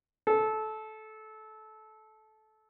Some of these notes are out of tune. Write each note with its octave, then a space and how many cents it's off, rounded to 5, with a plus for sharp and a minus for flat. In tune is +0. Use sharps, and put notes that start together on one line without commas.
A4 -20